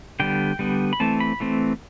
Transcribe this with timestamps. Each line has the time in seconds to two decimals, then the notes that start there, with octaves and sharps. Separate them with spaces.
0.20 D3 G3 B3 G5
0.59 D3 G3 B3
0.93 B5
1.00 E3 A3 C4 A5
1.20 B5
1.40 E3 A3 C4